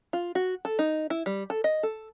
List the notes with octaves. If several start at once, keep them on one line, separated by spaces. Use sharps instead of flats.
F4
F#4
A4
D#4
E4
G3
A4
D#5
A4